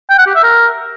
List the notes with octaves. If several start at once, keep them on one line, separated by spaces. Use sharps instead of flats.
G5
F#5
G4
E5
A#4